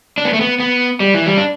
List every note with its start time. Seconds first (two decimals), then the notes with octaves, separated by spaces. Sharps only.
0.18 D4
0.25 B3
0.33 A3
0.41 B3
0.60 B3
1.00 G3
1.14 E3
1.26 G3
1.37 D4